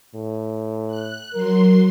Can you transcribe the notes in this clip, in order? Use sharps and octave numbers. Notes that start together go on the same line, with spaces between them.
A2
F#6
F#3 A#4 C6